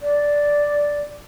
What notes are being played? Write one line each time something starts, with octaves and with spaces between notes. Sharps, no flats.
D5